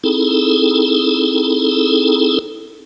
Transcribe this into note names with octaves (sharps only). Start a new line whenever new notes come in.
C4 D#4 E4 G#4 A4